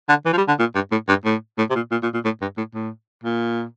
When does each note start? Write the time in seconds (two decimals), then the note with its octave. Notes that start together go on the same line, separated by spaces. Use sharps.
0.09 D3
0.26 E3
0.33 F3
0.38 G3
0.48 D3
0.59 A#2
0.75 G2
0.92 A2
1.09 G2
1.25 A2
1.58 A2
1.70 C3
1.76 A#2
1.92 A#2
2.03 A#2
2.14 A#2
2.25 A2
2.41 G2
2.58 A2
2.74 A2
3.24 A#2